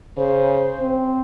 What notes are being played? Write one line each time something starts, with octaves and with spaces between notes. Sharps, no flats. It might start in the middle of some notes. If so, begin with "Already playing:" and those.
C#3 C5
C4